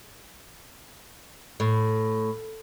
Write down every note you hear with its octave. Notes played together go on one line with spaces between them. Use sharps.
A2